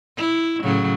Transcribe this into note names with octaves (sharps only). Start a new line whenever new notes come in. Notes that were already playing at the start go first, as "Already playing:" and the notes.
E4
A2 C#3 F#3